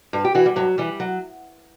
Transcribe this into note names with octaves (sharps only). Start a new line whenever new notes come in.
G2
G4
E3 F#4
G3
G2 F#3
E3 G3
F#3